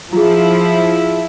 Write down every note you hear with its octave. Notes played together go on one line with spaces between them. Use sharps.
F3 E4 F4 G#4